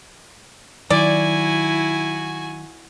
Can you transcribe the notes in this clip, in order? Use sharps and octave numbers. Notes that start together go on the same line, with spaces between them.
D#3 F#3 E4 F#4 D5 G#5